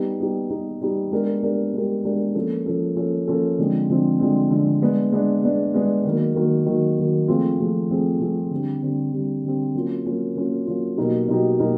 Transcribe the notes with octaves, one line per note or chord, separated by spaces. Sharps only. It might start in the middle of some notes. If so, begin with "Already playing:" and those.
Already playing: G3 B3 D#4 G4
G3 B3 D#4 G4
G3 B3 D#4 G4
G3 B3 D#4 G4
G#3 B3 D4 G4 A#4
G#3 B3 D4 G4 A#4
G#3 B3 D4 G4 A#4
G#3 B3 D4 G4 A#4
F3 A#3 C#4 F4 A4
F3 A#3 C#4 F4 A4
F3 A#3 C#4 F4 A4
F3 A#3 C#4 F4 A4
D3 F3 G#3 C4
D3 F3 G#3 C4
D3 F3 G#3 C4
D3 F3 G#3 C4
G#3 B3 D4
G#3 B3 D4
G#3 B3 D4
G#3 B3 D4
D#3 F#3 A#3
D#3 F#3 A#3
D#3 F#3 A#3
D#3 F#3 A#3
F3 A3 C4 F4 G#4
F3 A3 C4 F4 G#4
F3 A3 C4 F4 G#4
F3 A3 C4 F4 G#4
D3 G3 C4
D3 G3 C4
D3 G3 C4
D3 G3 C4
F#3 A#3 C#4 F4
F#3 A#3 C#4 F4
F#3 A#3 C#4 F4
F#3 A#3 C#4 F4
B2 F#3 A#3 D#4 G4
B2 F#3 A#3 D#4 G4
B2 F#3 A#3 D#4 G4